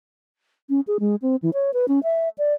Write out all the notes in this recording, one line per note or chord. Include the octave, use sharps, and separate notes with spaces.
C#4
G#4
G#3
C4
E3
C#5
B4
C#4
E5
D5